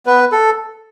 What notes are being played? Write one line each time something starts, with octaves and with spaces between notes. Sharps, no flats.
B3 B4
A4